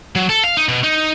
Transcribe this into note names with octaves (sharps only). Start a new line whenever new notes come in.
F#3
A4
F5
D#4
B2
D#4